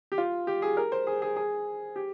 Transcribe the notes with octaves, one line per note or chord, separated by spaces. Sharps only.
G4
F4
G4
G#4
A#4
C5
G#4
G#4
G#4
G4